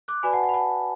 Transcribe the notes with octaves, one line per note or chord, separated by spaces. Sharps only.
D6 F#6
F#4 B4 D5 G#5 B5
F#5 A5
F#5
B5
F#5 A5